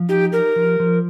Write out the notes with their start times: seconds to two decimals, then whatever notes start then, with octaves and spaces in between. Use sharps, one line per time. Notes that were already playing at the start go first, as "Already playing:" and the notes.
Already playing: F3
0.09 D#4 G4
0.32 G4 A#4
0.56 F3
0.80 F3